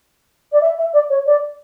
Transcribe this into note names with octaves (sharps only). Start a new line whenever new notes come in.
D5
E5
E5
D5
C#5
D5